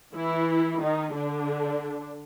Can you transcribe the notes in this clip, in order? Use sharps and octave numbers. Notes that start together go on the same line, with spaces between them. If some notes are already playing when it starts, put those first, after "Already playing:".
E3 E4
D#3 D#4
D3 D4